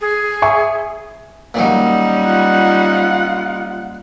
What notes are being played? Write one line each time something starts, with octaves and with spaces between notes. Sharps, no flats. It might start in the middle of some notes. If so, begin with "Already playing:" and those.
G#4
E5 G#5 C#6
A#2 D#3 F#3 G3 C#4 D#4
F4 F#5